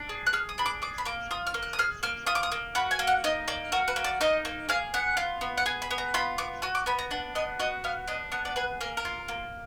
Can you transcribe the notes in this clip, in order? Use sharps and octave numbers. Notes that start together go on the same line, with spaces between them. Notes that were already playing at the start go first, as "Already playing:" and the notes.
Already playing: D4
G#4
F#6
G#4 F6
D#6
D4 B5
D6
G#4 D6
B5
A#3 D6
F4 D#6
F6
A#3
F#6
D#6
G#4 F6
A#3 F6
F4 D#6
D6
D#6
A#3
F#4 B5
G#5
A#3
F#5
D#4 D#5
A#3 D5
F#4 A#4
B4
A#3
D5
D#4 D#5
A#3
G#4 F5
B3 F#5
F4
B3
F#5
G#4 G#5
B5
B3
A#5
F4 B5
B3 D6
F#4 D#6
D6
B3 B5
A#5
D4 F#5
B3 D#5
F#4 D#5
B3 F5
D4 D#5
B3 F#5
D5
G#4 B4
A#3 A#4
A#4
F4
A#3